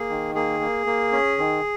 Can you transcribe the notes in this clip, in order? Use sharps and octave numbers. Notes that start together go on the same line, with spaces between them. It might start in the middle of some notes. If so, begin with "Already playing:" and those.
Already playing: A#3 G#4
D#3
A#3 G#4
A#3
A#3
C#4
D#3